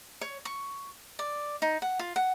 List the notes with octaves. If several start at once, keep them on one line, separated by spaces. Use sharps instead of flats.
C#5
C#6
D5
D#4
F#5
F4
F#5